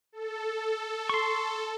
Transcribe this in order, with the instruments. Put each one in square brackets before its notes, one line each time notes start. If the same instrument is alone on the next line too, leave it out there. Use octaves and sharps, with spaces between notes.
[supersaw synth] A4
[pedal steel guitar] C6 C#6